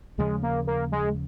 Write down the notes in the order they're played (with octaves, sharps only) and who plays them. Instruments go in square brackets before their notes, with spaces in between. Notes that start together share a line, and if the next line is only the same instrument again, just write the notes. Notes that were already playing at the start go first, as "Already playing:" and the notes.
[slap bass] D#2 C#3 F3 [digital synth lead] G#3
[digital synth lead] A#3
A#3
G#3